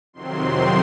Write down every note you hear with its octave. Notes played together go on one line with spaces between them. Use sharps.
F2 C3 D#3 F#3 C4 C6